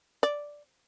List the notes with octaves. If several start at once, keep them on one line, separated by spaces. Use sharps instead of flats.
D5